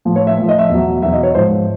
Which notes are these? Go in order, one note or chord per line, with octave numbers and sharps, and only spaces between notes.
A2 F3
C#5
E5
A2 F3 E5
D#5
E5
E2 B2 F#3
E2 B2 F#3 E5
D#5
C#5
G#2 F3 C5